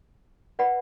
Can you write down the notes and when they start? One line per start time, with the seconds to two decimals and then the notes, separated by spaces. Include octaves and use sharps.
0.59 B4 D5 F#5 B5